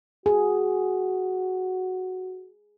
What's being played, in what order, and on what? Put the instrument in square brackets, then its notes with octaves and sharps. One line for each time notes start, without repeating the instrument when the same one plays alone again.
[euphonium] F#4 [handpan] G#4